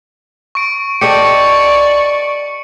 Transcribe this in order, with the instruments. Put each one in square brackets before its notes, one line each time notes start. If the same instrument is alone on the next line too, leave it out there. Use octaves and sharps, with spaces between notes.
[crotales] C#6 D7
[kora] G4 A4 D#5 [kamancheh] D5 C#6 [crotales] C#7